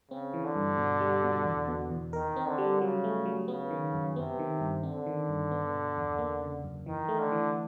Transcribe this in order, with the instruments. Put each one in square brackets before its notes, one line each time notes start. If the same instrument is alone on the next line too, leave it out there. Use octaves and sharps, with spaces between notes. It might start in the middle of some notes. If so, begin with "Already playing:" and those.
[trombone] C#3 [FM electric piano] C4
[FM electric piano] E3
[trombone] D3
[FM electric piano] G2
B2
G3
B2
E2
B2
E2
[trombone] D#3 [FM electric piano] A#4
[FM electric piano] C4
[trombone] D3
[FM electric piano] G3
[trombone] C#3 [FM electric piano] F#3
[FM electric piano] A3
F#3
[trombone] C#3 [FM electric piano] B3
[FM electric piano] D#3
F#2
[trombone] C3 [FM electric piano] B3
[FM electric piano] D#3
G2
[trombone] D3 [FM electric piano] C4
[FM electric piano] D#3
G2
B3
B2
E2
A#3
C#3
F#2
[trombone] D#3 [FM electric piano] E3
[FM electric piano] A3
[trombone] D3
[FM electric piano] E3